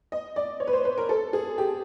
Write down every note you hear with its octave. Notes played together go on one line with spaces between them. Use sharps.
D#5
D5
C#5
B4
C5
B4
A#4
A4
G#4
G4